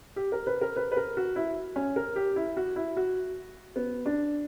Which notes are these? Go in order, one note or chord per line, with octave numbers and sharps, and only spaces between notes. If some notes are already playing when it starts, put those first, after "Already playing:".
G4
A#4
B4
A#4
B4
B4
A#4
F#4
E4
C#4
A#4
G4
E4
F#4
E4
F#4
B3
D4